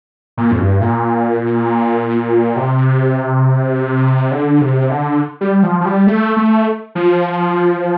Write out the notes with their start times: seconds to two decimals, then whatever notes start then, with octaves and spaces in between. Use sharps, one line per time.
0.37 A#2
0.51 F2
0.59 G2
0.81 A#2
2.56 C3
4.31 D3
4.61 C3
4.90 D3
5.41 G3
5.63 F3
5.81 F3
5.85 G3
6.07 A3
6.37 A3
6.95 F3